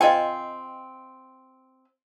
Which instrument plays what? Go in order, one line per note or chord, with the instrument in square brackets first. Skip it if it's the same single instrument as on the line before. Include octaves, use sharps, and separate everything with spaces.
[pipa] C4 F4 G#5 [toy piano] D#5 G5